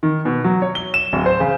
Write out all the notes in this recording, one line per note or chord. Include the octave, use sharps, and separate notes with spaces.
D#3
B2
F#3
C#5
G7
E7
D1
C5
C#3